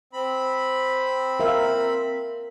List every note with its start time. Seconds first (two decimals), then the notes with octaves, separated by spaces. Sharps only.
0.13 C4 B5
1.40 A#4 E5 F5